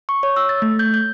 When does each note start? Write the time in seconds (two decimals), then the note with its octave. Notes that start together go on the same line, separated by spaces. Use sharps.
0.09 C#6
0.23 C#5
0.36 E6
0.49 A6
0.62 A3
0.79 G6
0.94 G6